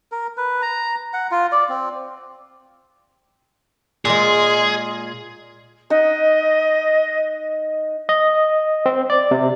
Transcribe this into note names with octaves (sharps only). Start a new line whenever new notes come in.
A#4
B4
A#5
F#5
F4
D5
C4
A#2 G#3 G#4
D#4 D#5 F#5
D#5
C4
D5
C3